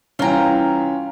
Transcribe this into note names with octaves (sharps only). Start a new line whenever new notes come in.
C2 E3 C#4 F4 G5 A#5